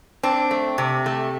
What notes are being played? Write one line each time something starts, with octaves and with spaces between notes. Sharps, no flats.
C4 D4
A3
C3
A3